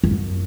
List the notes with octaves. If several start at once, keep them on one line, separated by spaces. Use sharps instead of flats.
F2
F#2